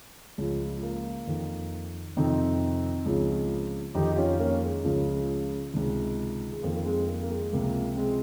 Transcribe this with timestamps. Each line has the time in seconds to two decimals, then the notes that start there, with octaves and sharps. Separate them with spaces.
0.38 C#2 C#3 F3 G#3
0.83 A#3
1.27 F2 D#3
2.17 F2 C3 D#3 C4 D#4
3.06 C#2 C#3 F3
3.95 F2 D#3 D#4 G4
4.12 G4
4.17 C#4 F4
4.39 A#3 C#4
4.62 G#3
4.84 C#2 C#3 F3
5.74 C#2 C3 D#3
6.52 G#3
6.62 F2 D#3 A#3
6.76 A#3
6.85 G#3 C4
7.08 A#3
7.23 A#3
7.30 G#3
7.52 C#2 C3 F3 A#3
7.97 G#3 C4